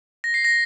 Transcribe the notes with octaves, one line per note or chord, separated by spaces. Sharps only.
A#6
C7
A#6